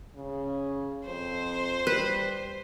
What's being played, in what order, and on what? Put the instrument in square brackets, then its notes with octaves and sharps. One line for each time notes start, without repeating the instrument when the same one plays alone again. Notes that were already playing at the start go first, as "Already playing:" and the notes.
[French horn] C#3
[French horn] F2 [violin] C5
[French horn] G3 [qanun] B4